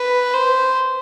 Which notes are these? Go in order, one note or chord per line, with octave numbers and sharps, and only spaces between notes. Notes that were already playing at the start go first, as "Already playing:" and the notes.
Already playing: B4
C5